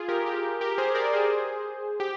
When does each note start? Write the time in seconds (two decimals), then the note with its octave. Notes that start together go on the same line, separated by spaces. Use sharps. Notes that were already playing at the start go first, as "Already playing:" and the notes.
Already playing: F4 G#4
0.09 G4 A#4
0.26 G4
0.61 G4 A#4
0.78 G#4 C5
0.95 A#4 D5
1.13 G#4 C5
2.00 G4